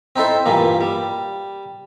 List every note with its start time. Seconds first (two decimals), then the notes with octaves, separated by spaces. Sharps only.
0.16 C4 D#4 E4 A4 C5
0.46 G2 A#2 E3 A#3
0.81 G3